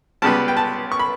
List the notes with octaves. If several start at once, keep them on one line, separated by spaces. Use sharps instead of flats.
C#2 C#3 G3 B3 A5
G5
A5
C#6
B5